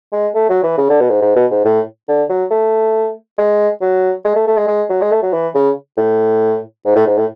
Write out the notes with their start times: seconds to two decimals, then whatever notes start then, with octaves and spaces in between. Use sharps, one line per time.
0.13 G#3
0.35 A3
0.50 F#3
0.63 E3
0.78 C#3
0.90 D3
1.00 B2
1.11 G#2
1.22 G#2
1.36 B2
1.51 G#2
1.65 A2
2.09 D3
2.30 F#3
2.51 A3
3.38 G#3
3.82 F#3
4.25 G#3
4.36 A3
4.47 A3
4.57 G#3
4.68 G#3
4.90 F#3
5.01 G#3
5.12 A3
5.23 F#3
5.33 E3
5.55 C#3
5.98 A2
6.85 G#2
6.96 A2
7.07 G#2
7.18 A2